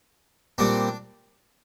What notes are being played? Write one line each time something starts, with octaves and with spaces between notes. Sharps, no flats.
A#2 G3 C4 D4